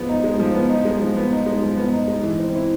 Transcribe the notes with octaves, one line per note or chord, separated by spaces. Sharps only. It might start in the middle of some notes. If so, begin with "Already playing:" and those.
Already playing: F3 G#3 B3
D#4
G#3
F3
B3
D#4
G#3
F3
B3
D#4
G#3
F3
B3
D#4
G#3
E3
C4
E4